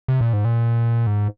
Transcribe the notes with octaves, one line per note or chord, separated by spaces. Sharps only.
C3
A#2
G#2
A#2
G#2